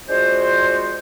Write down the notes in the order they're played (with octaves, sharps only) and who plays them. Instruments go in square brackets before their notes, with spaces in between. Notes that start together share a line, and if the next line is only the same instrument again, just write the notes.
[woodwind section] G#3 D4 F4 F#4 C5